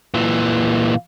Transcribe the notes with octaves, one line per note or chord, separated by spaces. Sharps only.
A#2 E3